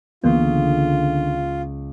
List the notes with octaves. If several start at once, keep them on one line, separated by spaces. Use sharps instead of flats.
C#2 D3 E3 A#3 B3 F4